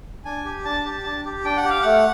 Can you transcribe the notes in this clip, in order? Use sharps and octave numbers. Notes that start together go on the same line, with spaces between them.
D4 G#5
G4
D4 A5
G4
D4
G4
D4 G5
F#5
G4 F5
A3 F#5